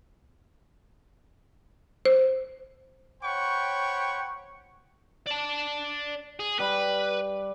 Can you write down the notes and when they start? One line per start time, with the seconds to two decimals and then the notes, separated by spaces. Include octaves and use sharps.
2.05 C5
3.22 C5 C#5 F#5 G5 B5 C#6
5.27 D5 A5
6.40 G#4
6.59 G3 B4